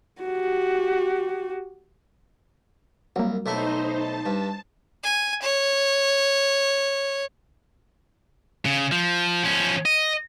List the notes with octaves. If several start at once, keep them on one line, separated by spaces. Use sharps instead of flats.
F#4 G4
C2 F#3 A#3
B1 A3 D#4 E4 C5
A5
G2
G#5
C#5
C#3
F3
F3 C#4
D#5